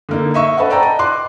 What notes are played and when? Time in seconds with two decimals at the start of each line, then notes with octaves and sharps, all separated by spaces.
0.09 D3 A#3 D#4
0.34 D#5 E5 C#6
0.57 A4 B4 D#5 F#5
0.70 D5 G5 A5 A#5
0.83 D#5
0.99 C6 D6 F#6